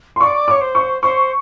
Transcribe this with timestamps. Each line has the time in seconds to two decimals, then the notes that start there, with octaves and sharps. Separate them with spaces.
0.16 C6
0.21 D5 C#6
0.48 C#5 D6
0.61 C5
0.75 C#6
1.02 C5 C#6